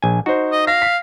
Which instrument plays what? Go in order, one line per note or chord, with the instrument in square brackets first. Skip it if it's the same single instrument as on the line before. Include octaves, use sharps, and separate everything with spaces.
[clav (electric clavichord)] A#1 G#5
[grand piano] D#4 C5 [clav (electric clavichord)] F#4
[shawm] D#5
[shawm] F5 [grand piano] A#6
[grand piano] B6